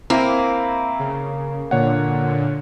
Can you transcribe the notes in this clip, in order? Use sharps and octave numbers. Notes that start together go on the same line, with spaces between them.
A#3 C4 E4
C#3
A#2 D3 C#5 F#5